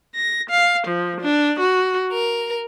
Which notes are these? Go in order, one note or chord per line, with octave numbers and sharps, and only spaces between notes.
A#6
F5
F3
D4
F#4
A#4